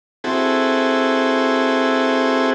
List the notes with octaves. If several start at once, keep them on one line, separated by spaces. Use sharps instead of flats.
C4 E4 F#4 G#4 A4